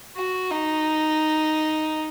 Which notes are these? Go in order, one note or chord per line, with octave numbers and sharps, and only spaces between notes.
F#4
D#4